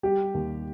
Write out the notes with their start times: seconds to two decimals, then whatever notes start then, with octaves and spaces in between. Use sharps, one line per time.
0.03 G3 G4
0.34 D#2